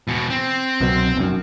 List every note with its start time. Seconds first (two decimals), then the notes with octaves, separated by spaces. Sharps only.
0.08 E2 B2
0.30 C4
0.80 C2 B2 F#3
1.16 F1 F#2